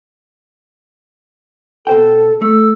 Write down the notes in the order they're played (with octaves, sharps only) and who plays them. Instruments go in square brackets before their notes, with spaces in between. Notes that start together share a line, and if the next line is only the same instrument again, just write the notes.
[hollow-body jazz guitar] B2 C5 G5 [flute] A4
[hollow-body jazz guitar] A3 [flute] E6